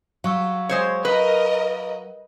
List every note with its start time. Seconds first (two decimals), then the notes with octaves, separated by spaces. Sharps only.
0.24 F#3 F5 C#6 E6
0.69 G#3 C5 C#5
1.05 A#4 B4 D#5